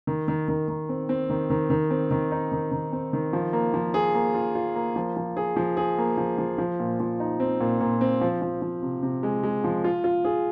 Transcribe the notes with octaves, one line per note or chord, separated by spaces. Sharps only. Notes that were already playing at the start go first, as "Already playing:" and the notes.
D#3
D#3
D#3
D#3
C4
C4
D#3
D#3
D#3
C4
D#3
D#4
D#3
D#3
C4
D#3
F3
A#3
F3
G#4
A#3
F4
F4
A#3
F3
F3
G#4
F3
G#4
A#3
F3
F3
F3
A#2
F3
D#4
C4
A#2
A#2
C4
F3
F3
F3
C3
C3
G#3
G#3
F3
F4
F4
G#4